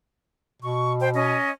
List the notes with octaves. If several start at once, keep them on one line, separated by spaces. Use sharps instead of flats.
B2 C#6
C5 G5
C#4 D#5